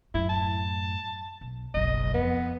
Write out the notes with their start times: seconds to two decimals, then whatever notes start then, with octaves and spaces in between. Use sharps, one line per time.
0.14 F#2 A2 E4
0.29 A5
1.41 B1
1.74 F#1 B1 D#5
2.14 F2 B3